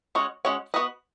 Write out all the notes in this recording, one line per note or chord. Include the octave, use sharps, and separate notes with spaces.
G#3 C#4 F#4 C#5
G#3 C#4 F#4 C#5
B3 F#4 B4 D#5